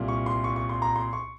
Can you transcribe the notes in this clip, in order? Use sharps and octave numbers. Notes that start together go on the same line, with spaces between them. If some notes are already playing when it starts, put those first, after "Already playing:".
Already playing: C2 A#2 G3
C#6
C6
C#6
C#6
C6
A#5
C6
C#6